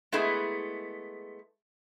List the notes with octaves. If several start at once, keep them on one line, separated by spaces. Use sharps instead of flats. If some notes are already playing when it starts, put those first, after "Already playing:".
G#3 A3 B3 E4 G#4